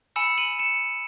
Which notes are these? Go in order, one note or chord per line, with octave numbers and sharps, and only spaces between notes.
G#5 B5 E6 C#7 E7
D#7 F#7
C#7 E7